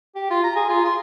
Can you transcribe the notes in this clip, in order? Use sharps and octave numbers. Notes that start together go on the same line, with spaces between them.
G4
F4
A#5
G#4
F4
C6